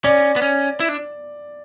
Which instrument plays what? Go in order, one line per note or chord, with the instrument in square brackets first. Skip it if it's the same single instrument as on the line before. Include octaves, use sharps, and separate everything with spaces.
[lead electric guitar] C#4 [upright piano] D5
[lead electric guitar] B3
C#4
E4
D4